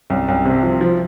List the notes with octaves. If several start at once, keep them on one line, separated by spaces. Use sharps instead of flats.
C2
C2
C3
F3
F3